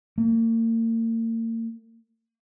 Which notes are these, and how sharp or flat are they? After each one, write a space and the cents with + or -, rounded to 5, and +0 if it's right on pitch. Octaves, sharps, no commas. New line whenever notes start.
A#3 -40